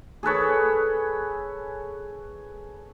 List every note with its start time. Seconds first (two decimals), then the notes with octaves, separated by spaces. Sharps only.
0.23 G#4 A4 B4 C#5